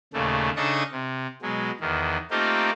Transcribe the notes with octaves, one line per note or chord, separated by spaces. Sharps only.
D#2 A#2 C#3 A3
C#3 D4 D#4 A4 C#6 D#6
C3
B2 F#3 G#3
E2 D#3
A3 A#3 C4 D#4 F4 G4